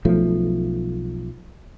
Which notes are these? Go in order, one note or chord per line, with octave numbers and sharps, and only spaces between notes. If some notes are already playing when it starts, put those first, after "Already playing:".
B1 F3 A3